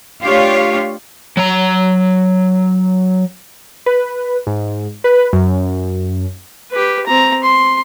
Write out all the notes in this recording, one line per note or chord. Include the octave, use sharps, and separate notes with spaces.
A3 D4 F4 G4 C#5 F5
F#3 A#5
B4
G#2
B4
F#2
G4 B4
C4 A#5
C6